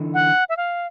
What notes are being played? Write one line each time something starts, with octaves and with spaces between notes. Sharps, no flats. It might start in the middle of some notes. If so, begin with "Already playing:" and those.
Already playing: D3 E3
F#5
E5
F5